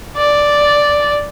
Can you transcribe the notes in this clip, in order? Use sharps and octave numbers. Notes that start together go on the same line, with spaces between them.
D5